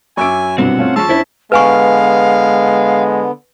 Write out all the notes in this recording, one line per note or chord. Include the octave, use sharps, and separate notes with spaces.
F#2 E5 G#5 C#6 D6 E6 D7
C2 G2 B2 C4 F#5
A3 C#4 F4
F3 G#3 C#4 A5 C#6 E6
E2 C#4 D4 E4 C5 E5
D3 G#3 B3 B4 F5 G#5 C#6